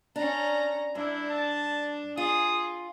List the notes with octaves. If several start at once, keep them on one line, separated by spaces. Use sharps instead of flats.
C#4 D4 A#5
G2 D4 E4
A5
F4 G#4 D#6